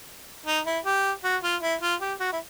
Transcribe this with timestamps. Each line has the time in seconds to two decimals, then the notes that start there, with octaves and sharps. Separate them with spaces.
0.46 D#4
0.66 E4
0.85 G4
1.24 F#4
1.43 F4
1.62 E4
1.81 F4
2.00 G4
2.20 F#4
2.33 E4